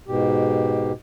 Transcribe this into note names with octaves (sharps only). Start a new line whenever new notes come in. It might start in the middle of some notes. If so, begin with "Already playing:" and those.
G#2 B2 G4